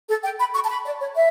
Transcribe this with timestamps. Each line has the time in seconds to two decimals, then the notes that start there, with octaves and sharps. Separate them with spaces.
0.08 A4
0.23 G5
0.39 B5
0.53 C#6
0.63 A5
0.69 B5
0.84 D5
0.99 C#5
1.15 E5